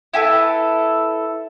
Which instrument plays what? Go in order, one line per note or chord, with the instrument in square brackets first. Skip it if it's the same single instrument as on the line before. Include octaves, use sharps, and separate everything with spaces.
[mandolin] E4 G4 A4 B4